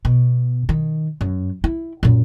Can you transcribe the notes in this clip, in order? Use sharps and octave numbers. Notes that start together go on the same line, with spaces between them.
B2
D#3
F#2
E4
F#2 A#2